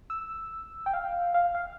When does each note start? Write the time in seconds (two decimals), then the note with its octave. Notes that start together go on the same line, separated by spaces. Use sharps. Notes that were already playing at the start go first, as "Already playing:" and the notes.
0.10 E6
0.86 G5
0.93 F5
1.34 F5
1.55 F5